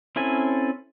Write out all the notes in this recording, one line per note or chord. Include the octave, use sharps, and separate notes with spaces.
C4 C#4 E4 A4 G#5